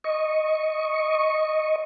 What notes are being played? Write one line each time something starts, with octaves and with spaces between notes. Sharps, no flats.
D#5 C#6